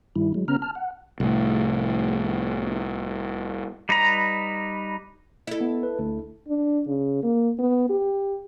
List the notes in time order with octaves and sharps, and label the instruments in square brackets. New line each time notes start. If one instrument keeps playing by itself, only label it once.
[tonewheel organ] G2 D#3 G3 E4
F#3 G#3
C#3 B3 C#4 A#5 F6
A5 F6
F#5
[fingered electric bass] C2 A2
[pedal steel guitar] G3 D#4 B4 A#5
[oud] E4 A4
[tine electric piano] B3
B4
D2
[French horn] D4
C#3
A#3
B3
G4